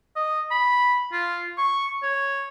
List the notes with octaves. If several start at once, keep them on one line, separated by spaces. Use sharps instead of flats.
D#5
B5
F4
C#6
C#5